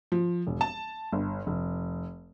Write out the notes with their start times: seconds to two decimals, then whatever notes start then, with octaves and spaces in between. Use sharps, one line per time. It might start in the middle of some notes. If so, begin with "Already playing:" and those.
0.12 F3
0.47 E1
0.61 A5
1.12 G1
1.47 F1